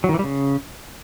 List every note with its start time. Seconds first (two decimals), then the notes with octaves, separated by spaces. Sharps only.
0.04 F#3
0.09 D#3
0.14 E3
0.19 G3
0.24 C#3